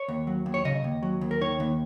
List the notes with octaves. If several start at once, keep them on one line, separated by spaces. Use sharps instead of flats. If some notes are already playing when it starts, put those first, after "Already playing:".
Already playing: C#5
D#2
F#3
D#2
C#5
C#3 D#5
D#2
F#3
D#2
A#4
D#3 C#5
D#2